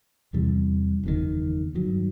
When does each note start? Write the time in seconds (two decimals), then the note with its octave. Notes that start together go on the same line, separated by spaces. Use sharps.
0.33 E2 C3 E3 G3
1.03 F#1 E2 C3 D#3
1.74 G2 D#3 F#3